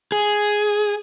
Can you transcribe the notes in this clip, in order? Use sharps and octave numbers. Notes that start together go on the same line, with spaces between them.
G#4